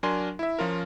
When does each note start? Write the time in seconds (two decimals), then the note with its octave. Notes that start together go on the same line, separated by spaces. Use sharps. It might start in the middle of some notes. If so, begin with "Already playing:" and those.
0.03 F#3 D4 A#4 G#5 C6
0.39 E4 E5
0.59 F3 C#4 F4 A#4